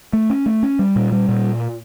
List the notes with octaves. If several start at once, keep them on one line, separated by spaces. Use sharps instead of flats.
A3
C#4
A3
C#4
G3
A#2
G3
A#2